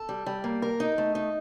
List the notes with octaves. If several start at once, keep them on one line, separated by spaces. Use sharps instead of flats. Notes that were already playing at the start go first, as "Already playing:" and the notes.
Already playing: A4
G3
G3
A#3
A#4
D#4
A3
D#4